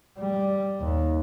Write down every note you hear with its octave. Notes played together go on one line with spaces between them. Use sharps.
G3
D#2